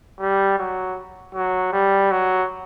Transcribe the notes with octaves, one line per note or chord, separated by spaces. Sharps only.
G3
F#3
F#3
G3
F#3